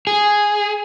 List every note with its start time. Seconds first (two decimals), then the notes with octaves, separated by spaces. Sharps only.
0.07 G#4